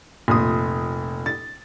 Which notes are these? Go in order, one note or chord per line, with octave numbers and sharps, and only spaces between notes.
F1 A#2 C6 D#6
A6